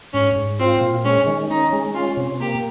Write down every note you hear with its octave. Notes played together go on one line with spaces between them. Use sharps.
G#2 C#4
G#2
C4 F4
A#2
G#3 C#4
D#3
C#4 D#4
G#3
C#4 F4
C3
A#3 G4